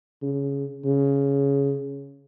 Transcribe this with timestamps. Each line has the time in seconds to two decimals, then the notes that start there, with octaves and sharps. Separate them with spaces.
0.22 C#3
0.85 C#3